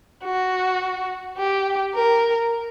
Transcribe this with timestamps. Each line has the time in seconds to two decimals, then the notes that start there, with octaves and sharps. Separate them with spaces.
0.24 F#4
1.38 G4
1.94 A#4